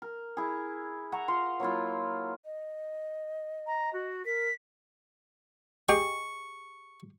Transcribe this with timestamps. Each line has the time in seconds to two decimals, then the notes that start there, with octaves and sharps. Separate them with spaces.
0.02 A#4
0.37 E4 G#4
1.12 E5 F#5 A#5 C#6
1.28 F4 F#5 A#5 C6
1.60 F#3 A#3 E4 F4
2.45 D#5
3.66 A#5
3.92 F#4
4.25 A#4 B6
5.89 G4 G#4 D#5 C#6